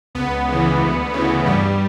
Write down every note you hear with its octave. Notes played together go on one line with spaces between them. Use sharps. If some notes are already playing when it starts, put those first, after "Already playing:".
C#2 B3
C#3 E3
D2
C#3 E3
G2 G3